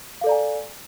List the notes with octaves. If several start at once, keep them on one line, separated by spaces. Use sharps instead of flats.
A4 D5 F5 G#5 A#5